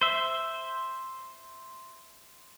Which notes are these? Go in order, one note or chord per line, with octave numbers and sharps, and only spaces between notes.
C5 E5